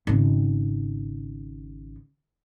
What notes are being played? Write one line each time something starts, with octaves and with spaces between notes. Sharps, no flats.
G#1 C#3